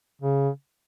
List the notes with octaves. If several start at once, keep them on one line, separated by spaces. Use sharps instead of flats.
C#3